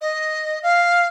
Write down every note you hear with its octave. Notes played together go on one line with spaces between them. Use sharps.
D#5
F5